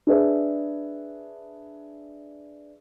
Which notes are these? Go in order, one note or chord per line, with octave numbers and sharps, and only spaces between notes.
D4 G#4 B4 E5